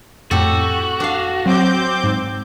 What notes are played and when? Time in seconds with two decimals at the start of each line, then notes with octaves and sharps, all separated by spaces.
0.31 F2 A2 F#4 G4 A4
1.00 D4 F5
1.46 F#3 C4 D6 G6
2.04 G#2